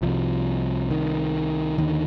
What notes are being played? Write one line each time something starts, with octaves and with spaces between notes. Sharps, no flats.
C2 C3 F3
D#3
D#2 D3 D#3